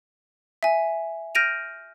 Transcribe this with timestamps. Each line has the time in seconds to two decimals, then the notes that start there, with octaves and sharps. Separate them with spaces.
0.63 E5 G#5
1.35 F6 G6 A#6 D7 D#7 F7